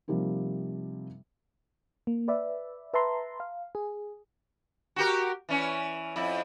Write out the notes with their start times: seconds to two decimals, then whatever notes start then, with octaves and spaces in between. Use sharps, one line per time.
0.08 C3 F3 G3 A#3 D#4
2.07 A#3
2.28 B4 D5 E5
2.94 B4 E5 A5 A#5 C6
3.40 F5
3.75 G#4
4.96 F#4 G4 A#4
5.49 E3 C#4
6.16 F2 E4